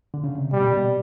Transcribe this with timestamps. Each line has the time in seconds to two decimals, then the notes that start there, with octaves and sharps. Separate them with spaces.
0.14 D3
0.24 C#3
0.38 C3
0.52 B2 G3
0.63 A#2
0.73 B2